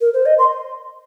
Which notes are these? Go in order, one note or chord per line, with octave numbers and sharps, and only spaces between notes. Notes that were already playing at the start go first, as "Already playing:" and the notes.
A#4
C5
D#5
C6